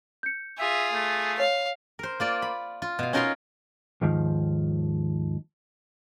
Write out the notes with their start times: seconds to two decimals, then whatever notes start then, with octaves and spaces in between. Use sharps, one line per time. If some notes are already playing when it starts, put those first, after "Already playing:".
0.23 G6 C#7
0.59 F4 G#4 E5
0.93 A3
1.40 C#5 F5
1.99 A#4 C5
2.20 A#3 F4 D5
2.42 B5
2.82 F4
2.99 B2 F5
3.13 C#4 D#4 F4 A#4 A#5 C6
4.01 D#2 G#2 D#3 F3